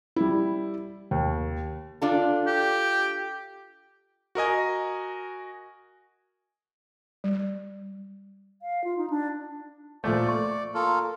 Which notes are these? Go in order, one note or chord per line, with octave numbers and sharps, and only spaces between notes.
G3 E4
D#2
D4 F4 A4
G4
F#4 A#4 D#5 G#5
G3
F5
F4
D#4
D4
A#2 F3 A3 D5
C#6
A#3 F4 A4